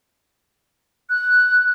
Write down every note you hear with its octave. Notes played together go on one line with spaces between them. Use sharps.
F#6